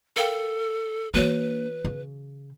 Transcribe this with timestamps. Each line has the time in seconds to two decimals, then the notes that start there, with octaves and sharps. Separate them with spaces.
0.16 A4 A#4 F5 G5
1.14 E3 A#3 D4 F#4 B4 C#5
1.85 C#3